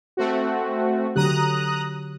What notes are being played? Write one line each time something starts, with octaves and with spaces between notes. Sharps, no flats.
A3 C4 F#4
D3 F#3 G4 A#5 D#6 F#6